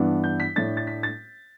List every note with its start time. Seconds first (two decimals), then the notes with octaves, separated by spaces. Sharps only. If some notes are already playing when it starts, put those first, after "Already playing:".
Already playing: G2 E3 B3 D4
0.24 G6
0.40 B6
0.56 A2 A3 D4 A6
0.77 A6
0.87 B6
1.03 A6